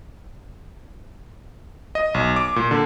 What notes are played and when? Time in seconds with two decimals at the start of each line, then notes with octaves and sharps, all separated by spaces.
1.95 D#5
2.14 B1
2.36 D6
2.56 A#2
2.71 D3